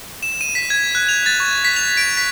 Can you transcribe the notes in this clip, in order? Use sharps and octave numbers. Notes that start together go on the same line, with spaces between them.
E7
D#7
B6
G#6
F#6
F7
A6
C#6
B6
F7
D7
B6